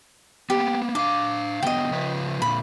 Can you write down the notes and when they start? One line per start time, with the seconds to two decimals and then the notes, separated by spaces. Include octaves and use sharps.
0.50 A#3 B3 G4
0.95 D4 E5 F5 D6
1.63 D3 F#3 B3 D#5 G5
1.91 C#3 F3 B4
2.42 A#2 D3 B5